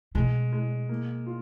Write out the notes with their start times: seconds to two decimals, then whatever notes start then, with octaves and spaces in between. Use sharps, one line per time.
0.15 B2 G#3
0.52 G#3
0.89 A#3
1.26 F4